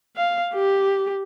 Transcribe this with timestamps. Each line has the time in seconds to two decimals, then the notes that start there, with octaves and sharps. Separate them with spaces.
0.17 F5
0.54 G4